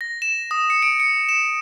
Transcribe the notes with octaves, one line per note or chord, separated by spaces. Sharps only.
A#6
E7
D#6
C#7
D7
C#7
E7